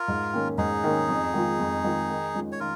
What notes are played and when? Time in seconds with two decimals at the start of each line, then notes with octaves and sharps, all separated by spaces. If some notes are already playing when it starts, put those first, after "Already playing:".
Already playing: F4 A#4
0.08 G#2
0.33 D#3 A#3 C#4
0.58 G#2 D#4 G#4
0.84 D#3 A#3 C#4
1.09 F2
1.34 D#3 G#3 F4
1.59 F2
1.84 D#3 G#3 F4
2.10 D#3
2.34 G#3 C#4 F4
2.52 C#5
2.60 D#3 F4 A#4